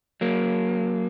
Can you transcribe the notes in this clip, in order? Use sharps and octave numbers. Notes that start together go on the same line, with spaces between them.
F#3 A#3